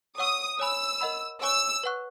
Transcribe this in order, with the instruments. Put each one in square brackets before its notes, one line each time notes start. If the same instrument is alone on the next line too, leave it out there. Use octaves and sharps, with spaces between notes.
[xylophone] C#5 F#5 C#6 E6 [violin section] D#6
[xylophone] C#5 G#5 B5 D#6 [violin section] E6
[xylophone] A#4 D#5 F#5 B5
[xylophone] C#5 G#5 C#6 [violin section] E6
[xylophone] B4 F#5 C#6 F#6